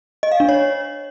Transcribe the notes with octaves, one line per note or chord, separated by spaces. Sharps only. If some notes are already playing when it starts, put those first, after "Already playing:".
D#5
F5
D4
C#5